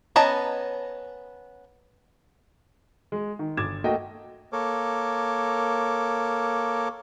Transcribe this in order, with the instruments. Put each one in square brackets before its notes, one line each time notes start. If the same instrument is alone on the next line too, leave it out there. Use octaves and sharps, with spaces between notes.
[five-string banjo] B3 C#4 D#5 A5 A#5
[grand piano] G#3
D#3
G1 D6 G#6 A6 E7
A3 A#3 F#4 D#5 G5
[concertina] A#3 A4 A#4 C#5 D6